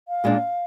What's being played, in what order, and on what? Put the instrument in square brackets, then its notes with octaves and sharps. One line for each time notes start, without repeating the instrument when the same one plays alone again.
[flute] F5
[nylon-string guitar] A#2 G#3 D4